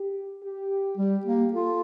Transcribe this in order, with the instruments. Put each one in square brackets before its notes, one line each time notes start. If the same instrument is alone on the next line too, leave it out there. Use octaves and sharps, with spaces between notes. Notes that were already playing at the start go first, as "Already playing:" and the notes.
Already playing: [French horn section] G4
G4
[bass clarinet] G3 [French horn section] G4
[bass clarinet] A#3
[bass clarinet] F4 [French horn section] A4